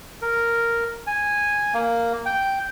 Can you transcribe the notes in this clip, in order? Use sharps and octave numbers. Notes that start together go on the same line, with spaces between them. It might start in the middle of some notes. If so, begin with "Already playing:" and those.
A#4
G#5
A#3
G5